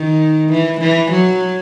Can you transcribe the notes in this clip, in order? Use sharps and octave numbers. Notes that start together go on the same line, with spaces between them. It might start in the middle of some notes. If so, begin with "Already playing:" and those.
Already playing: D#3
E3
E3
F#3